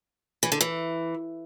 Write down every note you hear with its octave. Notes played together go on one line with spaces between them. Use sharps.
E3
D3
E3